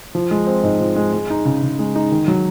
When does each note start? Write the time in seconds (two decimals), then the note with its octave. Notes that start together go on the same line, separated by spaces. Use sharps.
0.15 F3
0.31 G#3
0.47 C4
0.63 G#2
0.80 F3
0.96 G#3
1.13 G#3
1.30 D#4
1.45 C#3
1.63 C#3
1.79 G#3
1.95 D#4
2.12 D#3
2.28 F#3